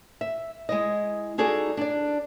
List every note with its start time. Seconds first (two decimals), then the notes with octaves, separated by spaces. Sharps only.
0.21 E5
0.69 G#3 E4 D#5
1.38 D#4 F#4 G#4 A4 D5
1.77 D4 D5